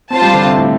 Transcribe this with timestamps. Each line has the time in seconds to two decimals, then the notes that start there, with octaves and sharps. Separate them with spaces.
0.10 C4 F4 C5 A5
0.22 G3
0.33 D3
0.45 C3
0.57 A2